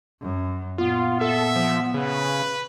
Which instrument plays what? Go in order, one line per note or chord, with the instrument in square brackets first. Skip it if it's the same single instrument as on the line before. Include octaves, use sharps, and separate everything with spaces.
[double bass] F#2
[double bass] A#2 [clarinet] B3 [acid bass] F4
[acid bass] A4 [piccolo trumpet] E5
[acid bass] F3
[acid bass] C#3 [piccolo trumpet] B4